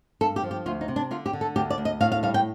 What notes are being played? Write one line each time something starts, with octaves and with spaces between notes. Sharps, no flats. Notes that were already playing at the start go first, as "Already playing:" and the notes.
G2 A4
G4
F3
G4
D2 F4
D#4
C3
D4
D3 F4
G4
D3
A4
D2 G4
D5
D2
D#5
A2 F5
F5
G3 F5
G5